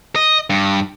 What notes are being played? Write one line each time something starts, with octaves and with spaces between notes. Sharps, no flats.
D#5
G2